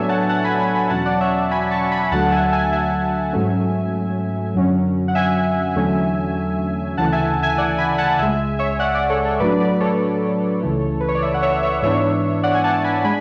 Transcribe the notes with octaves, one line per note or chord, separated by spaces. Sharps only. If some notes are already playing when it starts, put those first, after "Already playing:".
Already playing: A2 F#3 B3 D4 A4 C#5 E5 G#5
F#5 A5
F#5 A5
G#5 B5
G#5 B5
G#5 B5
E2 B2 F#3 C#4 F#5 A5
D5 F#5
C#5 E5
G#5 B5
A5 C#6
G#5 B5
D2 D3 F#3 A3 F#5 A5
F#5
E5 G#5
E5 G#5
E5 G#5
G#2 F#3 A3 C#4
F#2 D3 F#3 C#4
F#5
E5 G#5
E2 D3 F#3 A3 C#4
D2 C#3 E3 A3 F#5 A5
E5 G#5
E5 G#5
D5 F#5
G#5 B5
F#5 A5
C#2 C#3 G#3 E5 G#5
C#5 E5
D5 F#5
D5 F#5
A4 C#5
A4 C#5
A2 F#3 A3 D4 B4 D5
B4 D5
A4 C#5
C#2 C#3 E3 A3
B4
C#5
D5
C#5 E5
F#5
C#5 E5
C#5 E5
G#2 E3 B3 D4 C#5 E5
D5 F#5
G#5
F#5 A5
G#5 B5
G#3 D4 G#5 B5